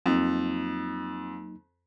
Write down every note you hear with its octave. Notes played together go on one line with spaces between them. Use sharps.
F2 F#3 A#3 D#4